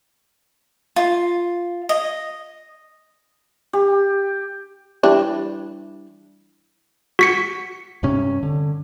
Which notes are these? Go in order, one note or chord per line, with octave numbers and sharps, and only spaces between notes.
F4
D#5
G4
E3 G3 D4
F#4 B6 C#7
G2 C3 C#4
D3